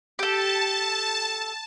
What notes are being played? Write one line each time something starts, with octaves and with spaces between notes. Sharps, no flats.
G4 A4 A5